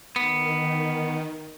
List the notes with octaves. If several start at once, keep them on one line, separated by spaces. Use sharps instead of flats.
D#3 B3